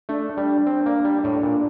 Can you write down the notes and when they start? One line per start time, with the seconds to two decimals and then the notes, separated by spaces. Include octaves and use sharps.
0.09 A3 D4
0.37 G3
0.66 C4
0.86 A#3
1.05 G3
1.24 A2 D4
1.43 A#2